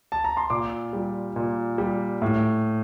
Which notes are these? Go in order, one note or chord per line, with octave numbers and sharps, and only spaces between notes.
A5
A#5
C6
A#2 D6
G3
A#2
G3
A2